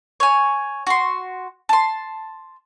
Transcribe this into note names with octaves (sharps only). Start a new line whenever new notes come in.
C#5 G#5
F#4 C6
A5 C6